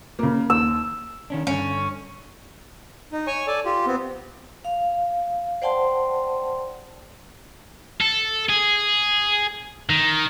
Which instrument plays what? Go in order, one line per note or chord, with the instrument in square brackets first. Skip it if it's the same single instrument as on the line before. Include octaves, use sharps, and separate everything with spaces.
[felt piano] C#3 A#3
[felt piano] D#2 [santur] E6
[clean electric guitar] D#3 C#4 D4
[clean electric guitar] G2 D3 [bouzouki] C#4
[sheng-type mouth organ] D#4
C#5 G#5 C#6
A4 D5 G#5 A5
F4 G4
B3 C4
[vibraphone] F5
C5 D5 F#5 G5 A5 C6
[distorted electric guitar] A4
G#4
D#3